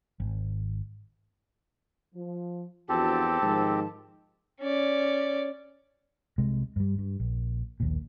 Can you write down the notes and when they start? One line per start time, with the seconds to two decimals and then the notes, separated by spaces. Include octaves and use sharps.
0.20 G#1
2.14 F3
2.89 E2 F3 C4 D4 F#4 G4 A4 A5
3.42 G#2 D#3 F3
4.61 C#4 D5
6.38 C2 C3 G#3
6.76 G2 G3
6.98 G2
7.20 A#1
7.80 A#1 D#2 A#2